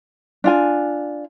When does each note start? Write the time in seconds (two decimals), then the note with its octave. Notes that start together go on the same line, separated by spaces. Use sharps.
0.44 D4 F4 G#5